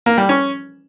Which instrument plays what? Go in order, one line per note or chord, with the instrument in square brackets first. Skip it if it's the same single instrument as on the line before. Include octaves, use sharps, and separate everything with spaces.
[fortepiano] A#3
G3
C#4